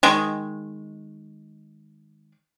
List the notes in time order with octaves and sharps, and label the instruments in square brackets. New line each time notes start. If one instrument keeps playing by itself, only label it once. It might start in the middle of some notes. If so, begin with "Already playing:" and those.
[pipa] D#3 G#3